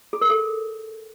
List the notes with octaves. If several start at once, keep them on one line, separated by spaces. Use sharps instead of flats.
G#4
A#4
A4